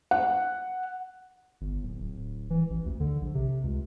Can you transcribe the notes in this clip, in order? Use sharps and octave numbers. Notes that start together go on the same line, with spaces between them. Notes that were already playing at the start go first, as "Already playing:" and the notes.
F#5
G1
D1
D1
E3
A1
D2
D3
A#1
C3
C#2